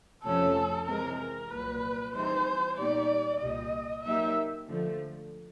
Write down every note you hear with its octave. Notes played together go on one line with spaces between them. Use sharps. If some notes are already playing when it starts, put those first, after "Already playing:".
F2 C3 F3 A3 C#4 A4
C3 E3 G#3 C4 A#4
A#4
C2 A#2 F#3 B4
E3 G3 C4 D#4 G#4 C5
A#2 G3 B3 D#4 G4 D5
C2 A#2 G3 D#5
F#3 A#3 D#4 G4 E5
D3 F3 A3